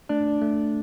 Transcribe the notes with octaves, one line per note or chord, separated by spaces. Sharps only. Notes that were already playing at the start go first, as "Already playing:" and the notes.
A3 D4
A3